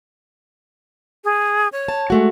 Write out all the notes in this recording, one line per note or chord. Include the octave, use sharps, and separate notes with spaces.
G#4
C#5
A5
G#3 A3 F#4